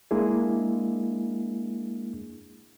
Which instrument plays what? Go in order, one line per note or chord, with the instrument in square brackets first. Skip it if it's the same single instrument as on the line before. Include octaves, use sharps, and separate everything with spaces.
[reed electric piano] G#3 A#3 D4 E4 G#4